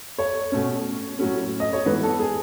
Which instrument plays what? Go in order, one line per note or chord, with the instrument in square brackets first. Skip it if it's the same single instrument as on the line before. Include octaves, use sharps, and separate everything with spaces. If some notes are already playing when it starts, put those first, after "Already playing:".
[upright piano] C#5
B2 A3 C#4
A2 F#3 C#4
D#5
C#5
G#2 E3 B3 B4
A4
G#4